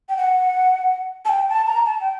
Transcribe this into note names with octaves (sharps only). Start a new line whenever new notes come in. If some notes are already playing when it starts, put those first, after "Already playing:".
G5
F#5
A5
G5
A5
A#5
A5
G5